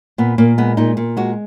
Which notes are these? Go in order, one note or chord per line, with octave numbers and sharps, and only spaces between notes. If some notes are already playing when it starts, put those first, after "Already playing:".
A#2 B3
A#2 A#3
G#3 B3
A#2 D#4
A#2
G#3 F#4